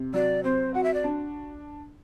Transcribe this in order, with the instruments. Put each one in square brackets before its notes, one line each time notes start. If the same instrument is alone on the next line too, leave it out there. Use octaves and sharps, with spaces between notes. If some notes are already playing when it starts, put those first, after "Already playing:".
Already playing: [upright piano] C3
[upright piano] F#3 [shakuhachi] D5
[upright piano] C4 [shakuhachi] C5
[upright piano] F#4 [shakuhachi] F#5
[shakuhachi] E5
D5
[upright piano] D4